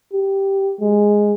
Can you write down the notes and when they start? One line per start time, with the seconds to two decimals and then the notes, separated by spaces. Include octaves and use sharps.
0.13 G4
0.80 G#3